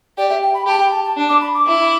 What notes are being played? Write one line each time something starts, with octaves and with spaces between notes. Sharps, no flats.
G4 D5
E5
G5
B5
G4 A5
G5
A5
A5
D4
D6
B5
D6
E4